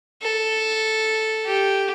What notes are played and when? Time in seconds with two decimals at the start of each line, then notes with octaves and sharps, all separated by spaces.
0.22 A4
1.46 G4